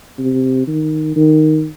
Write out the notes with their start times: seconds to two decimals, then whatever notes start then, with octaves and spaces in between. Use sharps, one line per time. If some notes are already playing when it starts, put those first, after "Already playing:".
0.19 C3
0.68 D#3
1.16 D#3